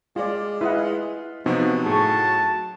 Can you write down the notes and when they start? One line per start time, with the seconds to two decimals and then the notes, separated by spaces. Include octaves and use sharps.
0.16 G#3 F4 D5
0.61 E4 F4 B4 D#5 F#5
1.46 C3 F3 F#3 B3 D#4
1.86 A2 G#4 A5 C#6